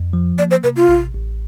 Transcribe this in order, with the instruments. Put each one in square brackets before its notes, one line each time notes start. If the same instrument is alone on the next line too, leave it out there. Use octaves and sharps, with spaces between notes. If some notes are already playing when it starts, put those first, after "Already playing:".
Already playing: [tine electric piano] F2
F3
[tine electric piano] A#3 [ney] D5
[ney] C5
[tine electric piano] C3 [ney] B4
[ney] F4
[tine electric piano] A1
A1